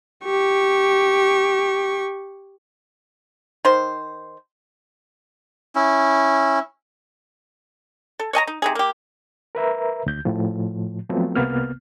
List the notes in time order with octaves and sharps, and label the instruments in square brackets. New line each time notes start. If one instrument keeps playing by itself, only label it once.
[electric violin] G4 C#6
[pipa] D#3 C5
[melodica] C#4 E4
[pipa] A4
C#5 D#5 G#5 A#5
D#4
C3 D#4 G#4
A#3 G4
[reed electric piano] A#4 B4 E5 A#5
D2 G6
A2 F3
F3 F#3 A3 B3 C4
C2 C3 A#3 B3 F6